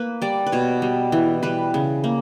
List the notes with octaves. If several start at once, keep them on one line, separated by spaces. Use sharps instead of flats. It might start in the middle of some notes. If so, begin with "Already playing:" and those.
Already playing: A#3 B4
G3 D5
B4
B2 C#5
G3
E3
G3 B4
C#3
A#3